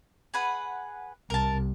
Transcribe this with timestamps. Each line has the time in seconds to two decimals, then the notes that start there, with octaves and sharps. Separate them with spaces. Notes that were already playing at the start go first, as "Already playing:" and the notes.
0.34 G#4 B4 F#5
1.30 C2 A#4 A5